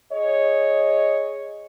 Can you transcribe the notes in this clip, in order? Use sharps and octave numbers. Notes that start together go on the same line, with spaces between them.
G#4 C#5 D#5